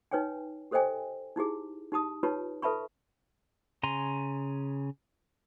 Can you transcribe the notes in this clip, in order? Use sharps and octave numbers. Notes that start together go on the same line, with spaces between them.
D#4 B4 C#5 G5 G#5
G4 A4 C5 D#5 G5 G#5
D#4 E4 G4 G#4
D#4 G4 A5 D#6
D#4 F4 G4 B4 C#5 A5
A4 B4 E5 A5 B5 C#6
C#3 G#5 A#5 C6